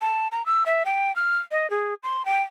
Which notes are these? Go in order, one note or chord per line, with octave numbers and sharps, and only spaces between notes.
A5
A#5
E6
E5
G5
F6
D#5
G#4
C6
G5